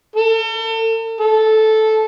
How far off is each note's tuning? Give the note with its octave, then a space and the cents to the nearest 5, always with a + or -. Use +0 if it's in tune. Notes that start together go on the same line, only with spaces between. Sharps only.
A4 +40
A4 -10